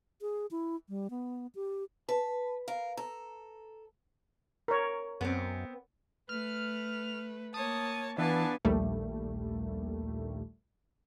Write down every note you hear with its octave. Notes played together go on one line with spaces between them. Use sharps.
G#4
E4
G3
B3
G4
B4 A5
A#4 F5
A4 A#5
A#4 C#5
F#2 B3 C4
A3 B4 F6
A#3 C#5 A5 D#6
E3 B3 D4 F5 G#5 A5
A#1 D#2 A#2 G3 A3